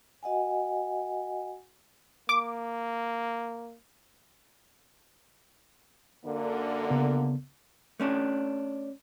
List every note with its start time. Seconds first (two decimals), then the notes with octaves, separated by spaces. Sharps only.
0.23 F#4 D#5 F#5 G#5
2.29 A#3 D6
6.25 F#2 D3 A#3
6.90 C#3 B3
8.00 A3 C#4 D4